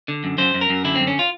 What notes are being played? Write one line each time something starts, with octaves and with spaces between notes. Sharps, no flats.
D3
F#2
F#2 C5
F#2
A#4
F#2
D3 E4
F#2 C4
C#4
F4